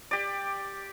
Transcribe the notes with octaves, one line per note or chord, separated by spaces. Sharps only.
G4 D5